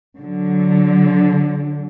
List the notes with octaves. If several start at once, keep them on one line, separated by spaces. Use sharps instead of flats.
D3 F#3